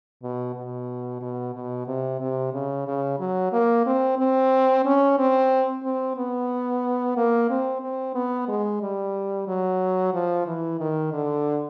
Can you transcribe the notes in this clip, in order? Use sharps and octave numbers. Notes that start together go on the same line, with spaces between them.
B2
B2
B2
B2
C3
C3
C#3
C#3
F#3
A#3
C4
C4
C#4
C4
C4
B3
A#3
C4
C4
B3
G#3
G3
F#3
F3
E3
D#3
D3